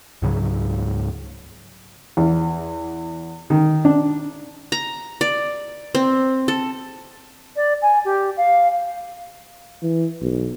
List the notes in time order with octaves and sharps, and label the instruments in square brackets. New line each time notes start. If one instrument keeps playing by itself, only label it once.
[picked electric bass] C#2 G#2 C#3 F#3
[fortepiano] E2
D#3
D4
[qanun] A#5
D5
C4
A4
[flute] D5
G#5
G4
F5
[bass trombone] E3
B1